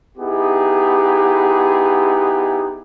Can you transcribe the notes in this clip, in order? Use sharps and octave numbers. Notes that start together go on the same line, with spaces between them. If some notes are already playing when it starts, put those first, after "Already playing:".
B3 D#4 E4 G4 G#4